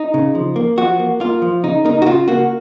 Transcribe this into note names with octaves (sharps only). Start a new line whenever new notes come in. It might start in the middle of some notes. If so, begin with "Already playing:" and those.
Already playing: D#4
C#3
F3
A#3
F3 F#4
A#3
A#3 F4
F3
C#3 D#4
A#3 D#4
F#4
C#3 F4
A#3 F#4